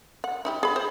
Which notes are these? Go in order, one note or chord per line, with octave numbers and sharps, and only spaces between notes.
F#5
D#4 E4 G4
G#4 B5
C5